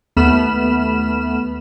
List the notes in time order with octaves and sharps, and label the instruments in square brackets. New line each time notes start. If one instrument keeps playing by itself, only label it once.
[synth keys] D#2 A3 B3 B5 F6 E7